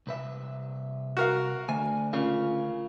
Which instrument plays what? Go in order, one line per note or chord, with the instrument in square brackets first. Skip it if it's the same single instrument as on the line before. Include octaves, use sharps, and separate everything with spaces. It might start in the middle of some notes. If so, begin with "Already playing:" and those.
[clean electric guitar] C2 B4 E5
[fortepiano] F#4 A#4 F5
[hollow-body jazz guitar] D2 [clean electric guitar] G#5
[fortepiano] C#3 [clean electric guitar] F4 A#4 F5